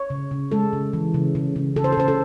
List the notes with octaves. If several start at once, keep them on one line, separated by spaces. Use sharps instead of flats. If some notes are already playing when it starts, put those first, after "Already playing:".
Already playing: C#5
C#3
C#3
G#3 A4
C#3
E3
C#3
C#3
C#3
C#3 A4
C5
A4
C#3 C5
A4